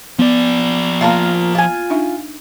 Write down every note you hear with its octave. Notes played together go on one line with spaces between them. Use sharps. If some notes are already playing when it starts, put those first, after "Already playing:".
F3 B3 D5
A#3 F4 F#4 A#4 F5 A5
F4 G#5
D4 D#4 E5